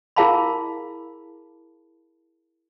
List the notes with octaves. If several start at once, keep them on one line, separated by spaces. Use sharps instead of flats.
E4 G#4 A#4 F5 A5 B5